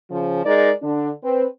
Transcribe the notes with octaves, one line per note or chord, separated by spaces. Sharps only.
C#3 F3
G#3 D#4 A#4 D5
D3 D4
C4 B4